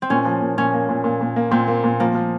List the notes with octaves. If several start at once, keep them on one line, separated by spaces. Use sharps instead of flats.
C4
A#2 C#4
F3
A#2
A#2 C#4
A#3
A#2
A#2
A#2
A#3
A#2 C4
A#3
A#2
F3 A#3
F3